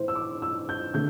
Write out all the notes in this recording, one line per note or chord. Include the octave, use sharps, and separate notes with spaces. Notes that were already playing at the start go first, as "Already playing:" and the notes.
Already playing: A2 E3 C5
E6
D6
E6
G6
D3 A3 G6